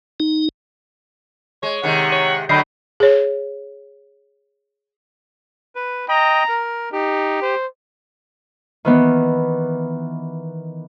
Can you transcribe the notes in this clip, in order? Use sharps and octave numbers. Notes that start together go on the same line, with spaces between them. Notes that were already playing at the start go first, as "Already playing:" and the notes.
D#4
G#3 C#5
C3 D#3 G#3 F#5
C#5
D3 F#3 A3 D#5 G5 B5 C7
G#4 C#5
B4
D#5 G5 A#5
A#4
D#4 G4
C5
D#3 E3 B3